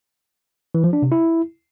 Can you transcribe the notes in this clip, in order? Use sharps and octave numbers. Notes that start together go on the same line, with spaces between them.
E3
F3
D4
C3
E4